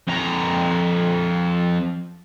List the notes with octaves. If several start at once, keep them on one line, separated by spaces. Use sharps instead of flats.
F2 A#5